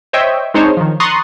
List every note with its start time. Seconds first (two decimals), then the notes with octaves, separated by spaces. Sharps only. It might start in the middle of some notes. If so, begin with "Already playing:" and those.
0.13 C5 C#5 D#5 E5 G5
0.54 G#3 C4 D4 D#4 C5 C#5
0.77 D#3 F3
1.00 A#5 C6 C#6 D#6 F#6 A6